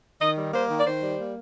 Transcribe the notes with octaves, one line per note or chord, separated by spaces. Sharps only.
D#3 D#5
G3
A#3 C5
D#3
D5
D#3 C5
G3
A#3